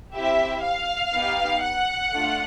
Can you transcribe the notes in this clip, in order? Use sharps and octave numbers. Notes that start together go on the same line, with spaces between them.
C4 E4 G4 E5
F5
B3 D#4 G4
F#5
A3 D4 F4